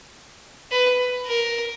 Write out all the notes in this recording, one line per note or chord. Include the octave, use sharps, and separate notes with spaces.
B4
A#4